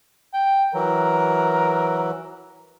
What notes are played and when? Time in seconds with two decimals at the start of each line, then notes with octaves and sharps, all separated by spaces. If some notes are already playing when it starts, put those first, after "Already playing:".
0.33 G5
0.74 E3 F#3 A#4